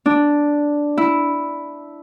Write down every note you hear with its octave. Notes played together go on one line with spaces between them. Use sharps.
D4
E4